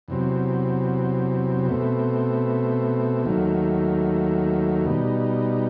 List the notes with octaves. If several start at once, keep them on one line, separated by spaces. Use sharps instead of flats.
E2 C3 F#3 C4
B2 A3 C4
D#2 D#3 F#3 A3
B2 G3 D#4